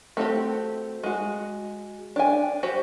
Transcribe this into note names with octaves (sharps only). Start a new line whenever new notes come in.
A3 C4 F#4 G4
G#3 F#4
D4 G#5
F#4 G4 C5